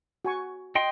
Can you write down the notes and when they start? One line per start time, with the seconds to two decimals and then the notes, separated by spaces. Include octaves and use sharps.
0.25 F#4 G#5 C#6
0.75 D#5 G5 C6